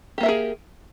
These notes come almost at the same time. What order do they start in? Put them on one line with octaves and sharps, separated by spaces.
G4 A#3 E5 A#4 G#4